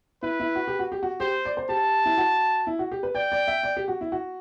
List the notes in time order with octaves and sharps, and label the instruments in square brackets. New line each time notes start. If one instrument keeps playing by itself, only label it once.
[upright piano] E4 [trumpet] B4
[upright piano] E4
F#4
G4
F#4
G4
F#4
[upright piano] G4 [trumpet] C5
[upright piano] D5
C5
[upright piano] G4 [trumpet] A5
[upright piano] E4
F#4
E4
F#4
G4
B4
[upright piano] D5 [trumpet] G5
[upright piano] D5
E5
D5
G4
F#4
E4
F#4